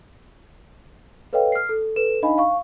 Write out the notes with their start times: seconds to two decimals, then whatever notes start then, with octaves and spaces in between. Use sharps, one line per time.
1.33 A4 B4 C#5 D#5 F5 G5
1.52 F6 C7
1.69 A4
1.96 A4 B4 E7
2.22 D4 D#4 D#5 F5 G#5 B5
2.38 F5 C#6